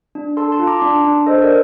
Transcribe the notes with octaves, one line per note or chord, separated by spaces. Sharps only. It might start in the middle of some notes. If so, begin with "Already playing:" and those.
D4
A4 A5 C6
A5 C6
F4
A#5 D6
D4 A5 C6
D4
A4 C5 D#5
A#4 D5